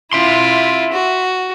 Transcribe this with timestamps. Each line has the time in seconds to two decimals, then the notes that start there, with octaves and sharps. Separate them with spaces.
0.13 E4 F4 E5 C6
0.93 F#4